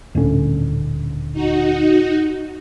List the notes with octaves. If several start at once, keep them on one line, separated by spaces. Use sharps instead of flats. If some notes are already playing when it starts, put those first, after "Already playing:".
D#1 D2 A2 D3 C#4
D#4 F#4